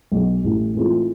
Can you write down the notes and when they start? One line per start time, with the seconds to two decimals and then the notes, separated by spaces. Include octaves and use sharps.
0.12 B1 B2 G#3
0.44 A1 A2 E3 G3
0.75 A2 E3 G#3 C4 F4